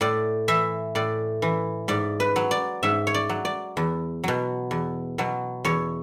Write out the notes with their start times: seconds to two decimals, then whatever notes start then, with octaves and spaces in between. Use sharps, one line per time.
0.01 A2 D5
0.48 E3 E5
0.95 A2 D5
1.42 E3
1.88 G#2 D5
2.20 B4
2.36 F#3
2.51 D5
2.83 G#2 E5
3.07 C#5
3.14 D5
3.29 F#3
3.45 D5
3.77 E2
4.24 B2 F#3
4.71 E2
5.18 B2 F#3
5.65 E2 C#5